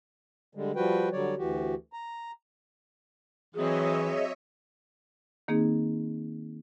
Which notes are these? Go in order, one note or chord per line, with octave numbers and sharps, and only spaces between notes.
D3 G3 G#3
F3 G3 F#4 B4 G5
D3 F#3 G3 C#5 D5
D2 E3 F#4 G4
A#5
E3 F#3 C4 G#4 C#5 D#5 E5
D#3 A#3 C4 D#4 G#4